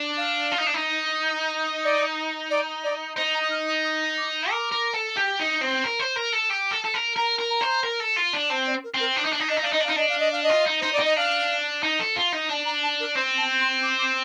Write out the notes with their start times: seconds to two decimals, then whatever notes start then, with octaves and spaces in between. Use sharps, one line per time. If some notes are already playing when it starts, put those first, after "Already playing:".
Already playing: D4
0.17 F5
0.52 F4
0.58 D#4
0.67 D4
0.74 D#4
1.84 D5
2.50 D5
2.84 D5
3.17 D#4 C5
3.34 A#5
3.42 D#6
3.50 F6
3.67 D#6
3.84 D#6
4.17 D6
4.50 A#4 D6
4.72 A#4
4.94 A4
5.17 G4
5.40 D#4
5.61 C4
5.84 A#4
6.00 C5
6.16 A#4
6.33 A4
6.51 G4
6.72 A4
6.85 A4
6.94 A#4
7.17 A#4 A#5
7.39 A#4
7.50 A#5
7.61 C5
7.83 A#4
8.00 A4
8.16 F4
8.33 D4
8.49 C4 A5
8.66 D5
8.84 A#4
8.94 C4
9.00 A#4
9.16 D4 C5
9.25 D#4
9.33 D4
9.40 D#4
9.49 D4 D#5
9.57 D#4
9.62 D4 F5
9.72 D#4 D#5
9.80 D4
9.84 D#4 F5
9.96 D4 D#5
10.09 F5
10.19 D#5
10.32 F5
10.43 D#5
10.49 F4
10.66 D#4
10.81 D#4 C5
10.93 D5
10.99 D#4
11.04 D#5
11.16 D4 F5
11.83 D#4
11.99 A4
12.16 F4
12.32 D#4
12.49 D4 A5
12.65 A#5
12.83 A5
13.00 A#4
13.16 C4 C5
13.37 A5
13.60 C6
13.82 D6
13.99 D6